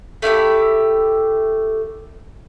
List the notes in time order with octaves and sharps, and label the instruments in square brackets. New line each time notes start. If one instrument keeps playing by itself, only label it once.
[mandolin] A3 E4 F4 G4